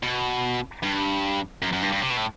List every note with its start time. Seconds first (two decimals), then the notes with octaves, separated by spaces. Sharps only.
0.03 B2
0.83 G2
1.62 F#2
1.73 F#2
1.83 G2
1.93 G2
2.03 C3
2.10 B2
2.17 A2